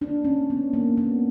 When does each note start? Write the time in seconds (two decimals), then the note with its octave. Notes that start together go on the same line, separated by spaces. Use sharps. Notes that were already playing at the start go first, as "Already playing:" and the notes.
0.01 A#3 D4
0.25 C#4
0.38 A#3
0.50 B3
0.73 A#2 A#3
0.97 B3
1.10 A#2